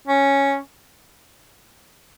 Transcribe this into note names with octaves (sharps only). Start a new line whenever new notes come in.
C#4